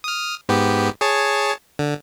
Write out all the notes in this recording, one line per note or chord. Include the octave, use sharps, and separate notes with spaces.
D#6 F6
G#2 B3 G4
G#4 C#5 A5
D3